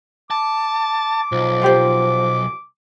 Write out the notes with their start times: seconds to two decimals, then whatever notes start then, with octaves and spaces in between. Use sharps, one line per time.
0.31 A5 D6
1.32 B1 F3
1.62 F4 G4 C5